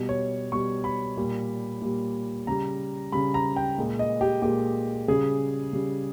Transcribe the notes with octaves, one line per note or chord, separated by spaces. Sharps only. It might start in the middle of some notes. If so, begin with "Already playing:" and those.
Already playing: B2 G3
C#5
B2 G3 C#6
B5
A#2 G3
A#2 G3
C#3 G3 A#5
C#3 G3 B5
A#5
G5
A#2 G#3
D#5
G4
A#2 G#3 G4
C#3 G3 G#4
C#3 G3